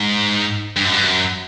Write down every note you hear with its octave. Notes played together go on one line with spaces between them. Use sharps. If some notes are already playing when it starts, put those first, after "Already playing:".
Already playing: G#2
G2
F#2
G2
F#2